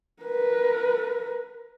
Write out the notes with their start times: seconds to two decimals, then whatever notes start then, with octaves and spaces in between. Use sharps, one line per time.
0.23 A#4 B4